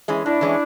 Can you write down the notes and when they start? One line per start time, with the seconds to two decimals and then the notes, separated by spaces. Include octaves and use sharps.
0.08 E3 G#3 C#4
0.25 A2 D4 E4
0.41 E3 G#3 C#4